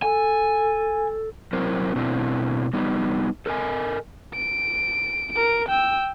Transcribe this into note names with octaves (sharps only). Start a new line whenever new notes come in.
A4 G#5
F#3 C4 E4 A#4 C5
B2 A3 C4 D4 E4
G3 B3 D#4
A4 A#4 D#5 G#5
D7
A#4 D7
G5 E6